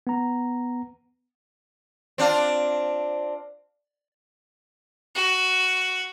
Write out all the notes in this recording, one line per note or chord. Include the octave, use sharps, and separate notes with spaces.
B3 A#5
C4 D4 F4
F#4